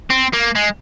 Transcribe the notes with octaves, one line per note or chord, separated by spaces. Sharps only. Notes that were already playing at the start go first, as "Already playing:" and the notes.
C4
A#3
G#3